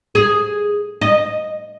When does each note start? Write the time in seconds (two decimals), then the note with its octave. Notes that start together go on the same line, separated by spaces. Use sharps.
0.15 G#4
1.01 D#5